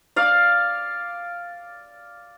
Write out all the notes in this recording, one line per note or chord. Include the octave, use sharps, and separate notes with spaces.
D5 F5